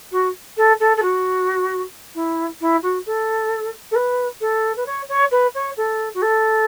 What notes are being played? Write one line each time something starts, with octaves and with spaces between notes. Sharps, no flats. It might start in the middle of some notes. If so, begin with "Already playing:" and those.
F#4
A4
A4
A4
F#4
E4
E4
F#4
A4
A4
B4
A4
B4
C#5
C#5
B4
C#5
A4
F#4
A4